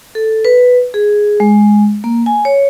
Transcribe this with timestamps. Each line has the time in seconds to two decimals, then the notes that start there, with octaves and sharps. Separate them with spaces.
0.15 A4
0.45 B4
0.94 G#4
1.40 G#3
2.04 A#3
2.26 G#5
2.45 C#5